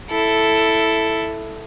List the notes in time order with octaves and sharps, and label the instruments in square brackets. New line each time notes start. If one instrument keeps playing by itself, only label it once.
[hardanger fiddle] E4 A4